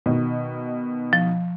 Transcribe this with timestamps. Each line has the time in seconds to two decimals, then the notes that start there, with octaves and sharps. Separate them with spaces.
0.06 B2 D#3
1.13 F3